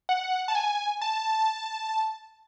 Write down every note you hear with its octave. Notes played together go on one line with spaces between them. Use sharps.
F#5
A5
G#5
A5